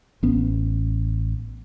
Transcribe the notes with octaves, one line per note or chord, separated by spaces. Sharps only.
A1 B3 C#4